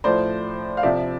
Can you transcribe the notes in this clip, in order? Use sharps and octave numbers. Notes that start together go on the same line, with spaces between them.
A2 F3 C5 D5
F5
C3 F3 D5 E5